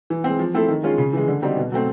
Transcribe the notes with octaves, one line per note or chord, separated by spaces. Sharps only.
E3
G#3 C4
F3
A3 C4 E4 A4
D#3
G#3 C#4 F4 G#4
C#3
E3 G#3
D3
G3 C4 D#4 F#4
B2
F#3 A3 C4